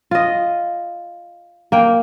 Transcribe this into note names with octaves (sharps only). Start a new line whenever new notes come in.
F4 D#5
A#3 G5